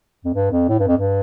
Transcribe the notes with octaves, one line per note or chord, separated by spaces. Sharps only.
F2
G2
F2
A2
G2
F2
G2